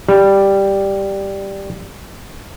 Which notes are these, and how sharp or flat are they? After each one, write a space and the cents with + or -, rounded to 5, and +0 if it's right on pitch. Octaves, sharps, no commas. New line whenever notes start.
G3 +0